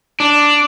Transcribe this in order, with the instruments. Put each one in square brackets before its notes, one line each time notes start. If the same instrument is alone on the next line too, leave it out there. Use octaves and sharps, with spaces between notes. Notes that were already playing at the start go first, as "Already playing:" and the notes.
[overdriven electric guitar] D4